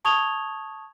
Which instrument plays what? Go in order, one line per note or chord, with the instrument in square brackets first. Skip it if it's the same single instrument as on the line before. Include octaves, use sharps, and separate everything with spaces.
[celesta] A5 C#6 D#6 G#6 F7 G7